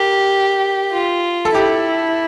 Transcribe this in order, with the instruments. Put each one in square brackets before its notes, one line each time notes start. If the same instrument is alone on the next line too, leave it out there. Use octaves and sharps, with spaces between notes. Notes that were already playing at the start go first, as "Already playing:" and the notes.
Already playing: [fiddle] G4 [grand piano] A#4
[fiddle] F4
[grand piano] A4
[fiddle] E4 [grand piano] G4